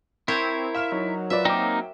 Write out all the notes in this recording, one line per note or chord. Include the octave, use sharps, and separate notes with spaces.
C4 E4 A#4 C5 C#5
E5 F5 F6 E7
F#3 D#4
F4 B4 D5 E5
A#3 C4 D#4 G5 D6